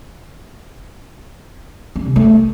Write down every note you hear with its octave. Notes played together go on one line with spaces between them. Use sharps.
C#4
C3
A3